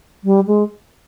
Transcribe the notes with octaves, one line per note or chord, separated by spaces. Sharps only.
G3
G#3